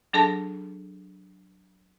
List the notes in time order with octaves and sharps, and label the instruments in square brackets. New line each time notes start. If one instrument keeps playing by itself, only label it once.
[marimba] F#3 D4 G#4 A4 A5 A#6